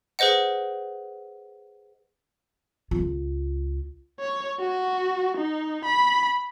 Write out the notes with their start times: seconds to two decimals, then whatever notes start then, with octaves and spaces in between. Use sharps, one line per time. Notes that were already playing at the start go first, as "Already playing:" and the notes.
0.19 G#4 B4 C5 D#5 F#5
2.91 C#2 F4
4.20 C#5
4.60 F#4
5.37 D#4
5.85 B5